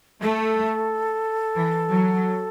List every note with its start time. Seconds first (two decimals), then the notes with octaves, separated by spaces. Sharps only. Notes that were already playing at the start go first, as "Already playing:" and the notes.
0.22 A3 A4
1.56 E3
1.90 F#3